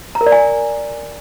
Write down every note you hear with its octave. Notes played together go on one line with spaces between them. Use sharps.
A#5
A#4
D5
G#5